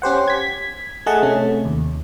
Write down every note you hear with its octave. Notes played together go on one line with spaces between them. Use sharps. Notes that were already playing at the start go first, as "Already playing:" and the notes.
C#4 G4 C5 F#5
G#6 B6
A3 G#4 D#5 F#5 A5
C3 A3 C#4
D#2